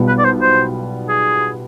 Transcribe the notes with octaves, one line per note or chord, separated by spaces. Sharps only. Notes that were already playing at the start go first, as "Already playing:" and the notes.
Already playing: B1 B2 G3 B3 F4
B4
D5
C5
C5
G#4